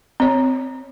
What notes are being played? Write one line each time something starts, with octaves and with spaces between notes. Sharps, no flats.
C4 C#5